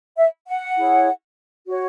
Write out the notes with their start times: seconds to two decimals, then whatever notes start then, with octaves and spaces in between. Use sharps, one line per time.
0.17 E5
0.47 F#5
0.77 E4 G#4 C#5
1.67 F#4 C#5